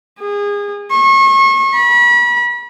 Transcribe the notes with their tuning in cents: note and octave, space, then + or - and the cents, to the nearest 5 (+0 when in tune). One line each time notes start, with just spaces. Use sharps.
G#4 -30
C#6 -35
B5 -35